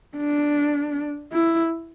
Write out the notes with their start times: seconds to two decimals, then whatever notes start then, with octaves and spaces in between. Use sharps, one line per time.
0.17 D4
1.32 E4